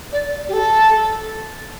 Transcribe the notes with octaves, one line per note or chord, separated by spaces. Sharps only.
D5
G4
A4